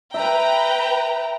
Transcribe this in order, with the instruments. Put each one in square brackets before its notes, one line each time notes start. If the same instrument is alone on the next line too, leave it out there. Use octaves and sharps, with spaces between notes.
[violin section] B4 G5 A#5 [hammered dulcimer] E5